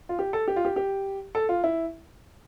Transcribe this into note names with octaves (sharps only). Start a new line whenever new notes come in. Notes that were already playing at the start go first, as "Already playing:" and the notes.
F4
G4
A4
G4
F4
G4
G4
A4
F4
E4